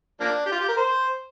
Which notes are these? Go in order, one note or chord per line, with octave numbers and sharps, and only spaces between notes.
F3 A#3 D4
G4
F4
G4
A#4
C5